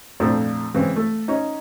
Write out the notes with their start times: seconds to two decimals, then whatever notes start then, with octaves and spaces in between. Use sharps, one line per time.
0.20 F2 A#2 A3 C4 D4
0.74 C#3 E3 G#3 C4
0.96 A3
1.28 C#4 D#4